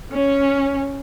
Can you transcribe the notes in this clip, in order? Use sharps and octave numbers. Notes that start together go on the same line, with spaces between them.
C#4